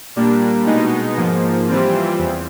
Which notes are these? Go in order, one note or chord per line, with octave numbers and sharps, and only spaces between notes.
A#2 G3 A#3 D4
B2 G#3 B3 D#4
G#2 F3 A#3
E3 G3 C4 F4
E2